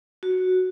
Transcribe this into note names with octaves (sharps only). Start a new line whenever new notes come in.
F#4